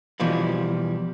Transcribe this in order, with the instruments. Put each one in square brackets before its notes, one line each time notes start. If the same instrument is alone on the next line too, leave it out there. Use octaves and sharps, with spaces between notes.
[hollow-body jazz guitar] B2 E3 F3 G3